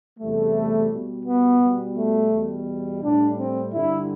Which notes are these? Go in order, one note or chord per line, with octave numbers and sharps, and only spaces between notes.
E2 C3 E3 G3 A3
B2 G3
B3
B2 G3
A3
E2 B2 G3
A2 G3 D4
C4
G2 D3 G3 E4